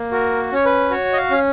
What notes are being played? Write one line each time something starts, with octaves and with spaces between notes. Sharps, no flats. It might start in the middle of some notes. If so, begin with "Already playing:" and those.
Already playing: A#3
F#4 A#4
C#4 C#5
B4
F#4 C#5
D#5
F5
C#4